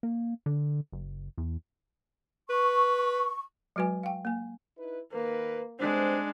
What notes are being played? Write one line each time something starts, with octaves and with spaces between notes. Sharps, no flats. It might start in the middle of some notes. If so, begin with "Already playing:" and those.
A#3
D3
F#1
E2
B4 C#6
F#3 G#3 F#4 B4 G#5
F5 G5
A#3 G#5
D#4 E4 B4
D#3 A#3 A#4 B4
G2 G#3 C4 D4 C5